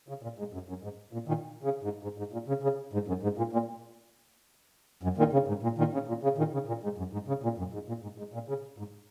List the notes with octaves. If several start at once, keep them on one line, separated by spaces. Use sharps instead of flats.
C#3
A#2
G#2
F#2
F#2
G#2
A#2
A#2 D#3
C#3
G#2
G#2
G#2
A#2
C#3
C#3
G#2
F#2
G#2
A#2
A#2
F#2
A#2 D#3
C#3
G#2
A#2
A#2 D#3
C#3
A#2
C#3
A#2 D#3
C#3
A#2
G#2
F#2
G#2
C#3
A#2
F#2
G#2
A#2
G#2
G#2
A#2
C#3
G#2